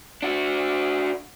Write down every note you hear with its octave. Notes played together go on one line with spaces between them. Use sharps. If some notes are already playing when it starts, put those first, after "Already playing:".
D4 F#4